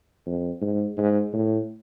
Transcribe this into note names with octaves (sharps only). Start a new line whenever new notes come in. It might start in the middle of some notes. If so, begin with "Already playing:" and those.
F2
G#2
G#2
A2